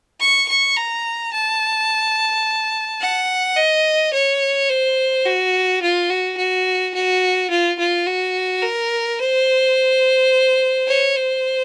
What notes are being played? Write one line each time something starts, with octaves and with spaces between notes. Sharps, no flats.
C#6
C#6
A#5
A5
F#5
D#5
C#5
C5
F#4
F4
F#4
F#4
F#4
F4
F4
F#4
A#4
C5
C#5
C5